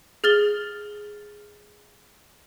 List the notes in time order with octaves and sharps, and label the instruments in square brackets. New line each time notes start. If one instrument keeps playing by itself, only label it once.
[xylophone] G#4 F6 A6 G7